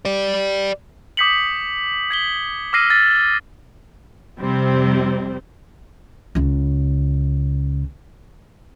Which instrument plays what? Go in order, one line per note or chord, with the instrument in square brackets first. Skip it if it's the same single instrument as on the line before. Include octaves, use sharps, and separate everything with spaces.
[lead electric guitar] G4 D5
[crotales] D6 D#6 G6 B6 C#7 F#7
G#6 B6 G7
D6 E6 F6 A#6 C7 D#7
A6
[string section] F2 C3 G3 C4
[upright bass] C#2 C#3